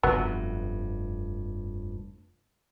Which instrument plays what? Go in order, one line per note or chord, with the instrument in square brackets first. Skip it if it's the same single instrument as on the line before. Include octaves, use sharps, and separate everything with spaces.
[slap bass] F1 G2 [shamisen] F#3 B3